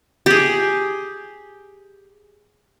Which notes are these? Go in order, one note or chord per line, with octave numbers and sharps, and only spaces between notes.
G4 G#4